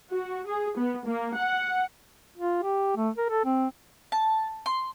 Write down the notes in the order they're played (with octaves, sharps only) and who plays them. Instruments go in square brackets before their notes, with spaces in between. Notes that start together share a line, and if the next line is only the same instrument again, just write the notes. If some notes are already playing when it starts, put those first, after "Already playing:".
[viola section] F#4
G#4
B3
A#3
F#5
[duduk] F4
G4
A3
A#4
A4
C4
[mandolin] A5
C6